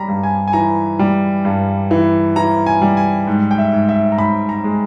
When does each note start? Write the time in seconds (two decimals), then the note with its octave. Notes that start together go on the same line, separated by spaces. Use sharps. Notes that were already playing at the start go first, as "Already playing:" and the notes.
Already playing: G3 A#5 B5
0.09 G2
0.23 G#5
0.48 G#5
0.53 E3 A#5
0.99 G3
1.45 G2
1.91 E3
2.36 E3 A#5
2.66 G#5
2.82 G3
2.97 G#5
3.27 G#2
3.51 G5
3.58 E5
3.73 G#2
3.89 E5
4.12 A#5
4.18 G#2 B5
4.49 A#5
4.64 G#3